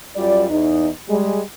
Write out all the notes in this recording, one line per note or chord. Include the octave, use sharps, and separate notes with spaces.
F#2 G3 F4 D5
E2 D#4
G3 G#3